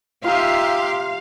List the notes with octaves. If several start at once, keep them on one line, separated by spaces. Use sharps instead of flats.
D#4 F4 G4 E5 F5 C6